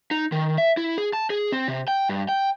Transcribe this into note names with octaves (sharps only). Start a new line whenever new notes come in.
D#4
D#3
E5
E4
G#4
A5
G#4
C4
C3
G5
G2
G5